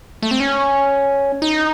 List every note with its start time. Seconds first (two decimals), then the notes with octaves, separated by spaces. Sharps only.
0.23 A3
0.31 C4
0.40 C#4
1.42 D#4